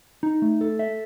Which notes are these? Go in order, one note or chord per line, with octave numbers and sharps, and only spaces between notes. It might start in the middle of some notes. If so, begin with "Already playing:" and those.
D#4
A3
A4
E5